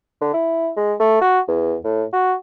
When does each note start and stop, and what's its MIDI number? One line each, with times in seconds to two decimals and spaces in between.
0.21 0.31 50
0.34 0.69 64
0.77 0.94 56
1.00 1.19 57
1.21 1.39 66
1.48 1.76 40
1.84 2.04 45
2.13 2.34 66